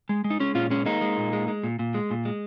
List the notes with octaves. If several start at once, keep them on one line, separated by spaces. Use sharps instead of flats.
G#3
G#3
D#4
G#3 C#4
A#2 C#4 F4
G#3 C#4
G#3 A#3 D#4
G#3
A#2
G#3
G#3
A#2
A#2
G#3
A#2
G#3